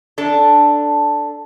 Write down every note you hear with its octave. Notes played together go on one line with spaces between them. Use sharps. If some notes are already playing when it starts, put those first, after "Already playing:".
D4 A4